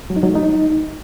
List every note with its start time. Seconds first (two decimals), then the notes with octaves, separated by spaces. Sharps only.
0.10 F#3
0.16 D#4
0.23 F#3
0.29 A3
0.36 D#4